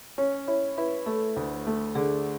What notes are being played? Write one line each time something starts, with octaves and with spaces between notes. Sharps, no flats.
C#4 C#5
E4 C#5
E4 B4
A3 A4
D2
A3
D3 G#4